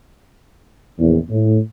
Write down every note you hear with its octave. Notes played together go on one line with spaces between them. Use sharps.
A#1 E2
A2